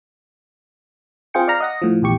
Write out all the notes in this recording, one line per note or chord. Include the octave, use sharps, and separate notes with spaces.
C4 F4 G#4 G5 C#7
D5 F5 A#5
D#5 F#5 A#6
A2 F3
A#1 E2 G4 C#6